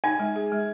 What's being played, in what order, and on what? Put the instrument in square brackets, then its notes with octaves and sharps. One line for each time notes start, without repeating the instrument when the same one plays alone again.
[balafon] D#4 [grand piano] G#5
[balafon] G#3
G#4
G#3